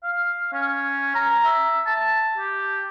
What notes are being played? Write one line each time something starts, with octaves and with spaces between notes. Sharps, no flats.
F5
C#4
A#5
E5
A5
G4